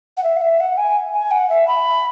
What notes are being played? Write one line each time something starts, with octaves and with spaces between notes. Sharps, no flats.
F#5
E5
F#5
E5
F#5
G#5
G#5
F#5
E5
B5